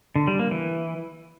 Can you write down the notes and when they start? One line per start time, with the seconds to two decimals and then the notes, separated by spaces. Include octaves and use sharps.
0.16 D3
0.27 G3
0.39 A#3
0.51 E3